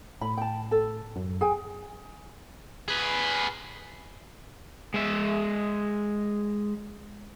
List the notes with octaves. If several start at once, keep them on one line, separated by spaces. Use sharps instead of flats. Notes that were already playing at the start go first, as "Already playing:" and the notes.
A2 B5
G5 A5
A4
F#2
G#4 G5 G#5
G#4 B4
G#3 E5